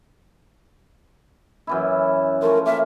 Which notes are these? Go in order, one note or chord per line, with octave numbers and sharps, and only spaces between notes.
F#2 E3 E4
F3 A3 C#4 A#4
A#3 E5